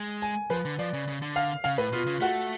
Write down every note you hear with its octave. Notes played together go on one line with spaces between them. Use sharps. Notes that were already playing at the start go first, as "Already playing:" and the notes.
Already playing: G#3
G#5
F3 B4
D3
F3 D5
C#3
C#3
D3
F5
C#3 F5
A2 B4
B2 F4
C#3
A3 F#4